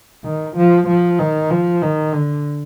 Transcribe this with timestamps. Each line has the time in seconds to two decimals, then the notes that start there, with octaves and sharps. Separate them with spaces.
0.24 D#3
0.56 F3
0.88 F3
1.19 D#3
1.50 F3
1.82 D#3
2.13 D3